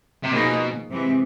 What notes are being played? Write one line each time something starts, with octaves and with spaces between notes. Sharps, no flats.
C3
B2 F3 A#3 D#4 G#4
C3 E3 G#3 C4